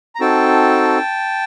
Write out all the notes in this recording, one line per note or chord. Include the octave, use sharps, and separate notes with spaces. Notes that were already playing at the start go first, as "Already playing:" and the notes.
A#5
C4 D#4 F#4 A4 G5 A5